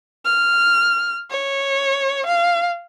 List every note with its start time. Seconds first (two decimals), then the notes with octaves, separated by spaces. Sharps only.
0.25 F6
1.30 C#5
2.26 F5